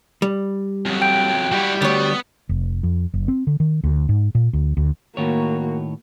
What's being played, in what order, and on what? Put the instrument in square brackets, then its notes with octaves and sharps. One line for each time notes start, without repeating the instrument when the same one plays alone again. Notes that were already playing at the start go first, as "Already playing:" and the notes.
[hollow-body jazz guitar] G3
[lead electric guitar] F2 F#3
[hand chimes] G5 G6 D7
[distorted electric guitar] G3 [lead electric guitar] E4 F#4
[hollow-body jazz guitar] D2 C#5 [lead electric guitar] B3
[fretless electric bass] F1
F2
F#1
C4
D3
D#3
D2
G#2
A#2
D2
D2
[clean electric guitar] A2 D#3 C#5 [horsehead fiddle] A#3 F#4